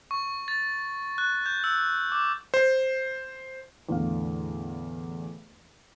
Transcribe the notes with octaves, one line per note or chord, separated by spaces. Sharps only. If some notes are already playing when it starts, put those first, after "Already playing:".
C#6
A6
F#6
G6
E6
D6
C5
E2 A2 D3 F5